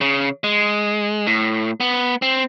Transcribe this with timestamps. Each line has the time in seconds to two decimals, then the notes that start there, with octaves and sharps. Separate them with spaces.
0.01 C#3
0.44 G#3
1.27 A2
1.80 B3
2.22 C4